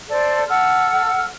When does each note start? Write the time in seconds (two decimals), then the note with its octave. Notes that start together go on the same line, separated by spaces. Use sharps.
0.09 A4 C5 D5
0.49 A4 F#5 E6 F6